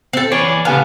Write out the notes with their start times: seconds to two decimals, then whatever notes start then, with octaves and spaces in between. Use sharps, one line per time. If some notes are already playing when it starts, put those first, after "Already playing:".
0.13 C4 A4
0.32 E3 G#4 C#5 D5
0.65 A2 C#3 B3 G4 F5 G#5 A5